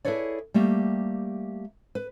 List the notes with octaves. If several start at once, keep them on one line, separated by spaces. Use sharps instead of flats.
E4 G#4 A4 B4 C#5 D5
G3 A3 A#3 G4
B4